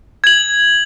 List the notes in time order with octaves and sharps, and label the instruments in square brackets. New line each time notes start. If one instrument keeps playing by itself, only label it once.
[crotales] G#6 F#7